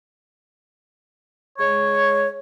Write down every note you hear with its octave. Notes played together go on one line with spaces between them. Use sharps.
G#3 C#5